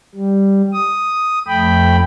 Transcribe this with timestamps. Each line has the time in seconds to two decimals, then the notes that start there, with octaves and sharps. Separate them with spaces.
0.15 G3
0.73 D#6
1.48 F2 A3 G5 B5